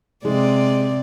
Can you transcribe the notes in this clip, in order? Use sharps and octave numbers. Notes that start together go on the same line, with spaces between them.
C3 G#3 D5